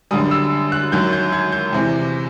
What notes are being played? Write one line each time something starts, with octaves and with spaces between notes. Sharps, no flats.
F#2 D3 G3 D#6
E6
F#6
F#2 D#3 F#3 G6
G6
G#6
G6
E2 C3 E3